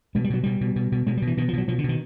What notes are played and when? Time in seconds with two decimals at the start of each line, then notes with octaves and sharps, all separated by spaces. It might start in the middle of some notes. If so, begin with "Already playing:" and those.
0.15 B2 G#3
0.24 G3
0.30 B2 F#3
0.43 B2 G3
0.61 B2
0.76 B2
0.92 B2
1.07 B2 G#3
1.17 G3
1.22 B2
1.27 E3
1.37 B2 D#3
1.48 F3
1.53 B2 F#3
1.68 B2 F3
1.78 D3
1.84 B2
1.89 D#3